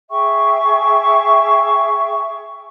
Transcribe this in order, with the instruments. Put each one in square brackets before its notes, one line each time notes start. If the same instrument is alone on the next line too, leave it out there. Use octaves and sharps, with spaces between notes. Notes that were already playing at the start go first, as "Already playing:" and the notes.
[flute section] G#4 E5 G5 C#6